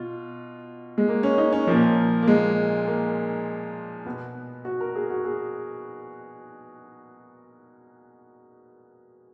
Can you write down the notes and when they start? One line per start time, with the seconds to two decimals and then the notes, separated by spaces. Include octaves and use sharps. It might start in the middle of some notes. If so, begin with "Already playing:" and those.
Already playing: B2 F4
0.98 G#3
1.08 A#3
1.23 C#4
1.38 D#4
1.53 C#4
1.67 A#2 F3 A#3
2.22 A#3
2.27 G#3
2.87 A#3
4.06 B2 B3
4.65 F#4
4.80 A#4
4.96 G#4
5.10 F#4
5.25 G#4